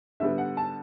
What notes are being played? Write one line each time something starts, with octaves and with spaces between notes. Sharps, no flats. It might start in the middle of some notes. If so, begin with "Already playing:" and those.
D3 G3 B3 E5
F#5
A5